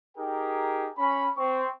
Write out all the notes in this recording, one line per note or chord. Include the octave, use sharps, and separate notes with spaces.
D#4 G4 G#4 A#4 G5
C#4 B5
C4 C#6